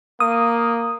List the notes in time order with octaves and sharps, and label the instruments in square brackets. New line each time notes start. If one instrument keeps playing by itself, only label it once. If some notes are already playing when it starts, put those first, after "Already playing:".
[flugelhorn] A#3 [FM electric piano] D#6